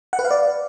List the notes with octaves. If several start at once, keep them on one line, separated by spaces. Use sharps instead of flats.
F#5
B4
F5
D5